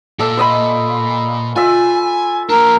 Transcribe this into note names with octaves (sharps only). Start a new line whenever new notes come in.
A#2 A4 E5
C5 D#5 B5
F4 E5 G#5
A#3 D4 A#4